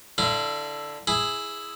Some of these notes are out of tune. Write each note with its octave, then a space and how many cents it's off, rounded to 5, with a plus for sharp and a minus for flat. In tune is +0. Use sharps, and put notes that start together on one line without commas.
D3 +0 E4 +0 F5 -40
E4 +0 G#4 +0